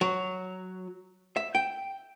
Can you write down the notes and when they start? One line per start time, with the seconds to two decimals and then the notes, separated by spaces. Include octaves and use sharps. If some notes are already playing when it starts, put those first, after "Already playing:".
0.01 F#3
1.36 E5
1.55 G5